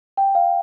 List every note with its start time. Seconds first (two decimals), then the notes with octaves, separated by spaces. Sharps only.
0.17 G5
0.35 F5